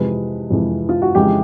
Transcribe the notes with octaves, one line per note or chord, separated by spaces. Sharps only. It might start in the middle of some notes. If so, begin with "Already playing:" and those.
Already playing: F2 C3 E3 G#3 B4
F2 C3 E3 G#3
F4
F#4
F2 C#3 E3 G#3 G4